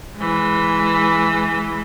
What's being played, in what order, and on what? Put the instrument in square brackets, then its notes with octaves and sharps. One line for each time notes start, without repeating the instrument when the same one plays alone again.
[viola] E3 G#3